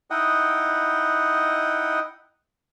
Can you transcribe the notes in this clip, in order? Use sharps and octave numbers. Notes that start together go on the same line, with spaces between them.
D#4 E4 D#5 F#5 G5